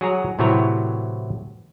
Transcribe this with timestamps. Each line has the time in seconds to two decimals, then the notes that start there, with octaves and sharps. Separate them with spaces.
0.01 F#3 F#4 G#4 C#5 A#5
0.39 A2 C3 E3 F#3 C#5 A#5